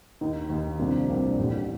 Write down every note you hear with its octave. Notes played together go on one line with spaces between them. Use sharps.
D#2 D#3 A#3 D#4
D#2 D#3 A#3 D#4
C2 C3 F3 A#3 D4
C2 C3 F3 A#3 D4
A1 A2 G3